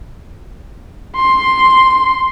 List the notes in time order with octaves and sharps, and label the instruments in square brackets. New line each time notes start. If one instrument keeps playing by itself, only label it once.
[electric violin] C6